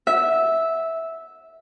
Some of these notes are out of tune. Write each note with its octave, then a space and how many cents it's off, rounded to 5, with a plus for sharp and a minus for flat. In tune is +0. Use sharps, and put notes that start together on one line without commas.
E5 -10